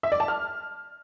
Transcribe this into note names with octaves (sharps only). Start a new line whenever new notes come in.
E5
D5
A5
F6